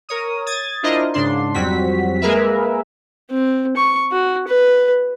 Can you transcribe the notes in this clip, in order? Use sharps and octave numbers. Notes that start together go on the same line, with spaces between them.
A#4 C#5 D#6
D#6 G#6 A6
D4 E4 F4 A#4 C5 D#5
G#2 C#3 D4 C6
F2 F#3 G3 C4 F#4 B6
G#3 A#3 G#4 A#4 B4 E5
C4
C#6
F#4
B4